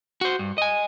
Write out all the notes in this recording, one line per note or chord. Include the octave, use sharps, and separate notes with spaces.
F#4 C5
G2
D#5 G#5